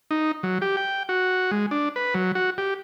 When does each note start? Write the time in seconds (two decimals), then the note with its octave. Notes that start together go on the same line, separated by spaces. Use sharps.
0.11 D#4
0.43 F#3
0.62 G4
0.77 G5
1.09 F#4
1.51 G#3
1.71 D4
1.96 B4
2.15 F#3
2.35 F#4
2.58 G4